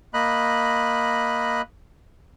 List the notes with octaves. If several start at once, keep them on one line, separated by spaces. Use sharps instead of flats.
A#3 D#5 B5 F#6